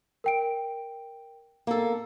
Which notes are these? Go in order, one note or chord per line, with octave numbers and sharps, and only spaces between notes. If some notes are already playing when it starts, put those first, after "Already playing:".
A#4 G5 D7
A#3 A4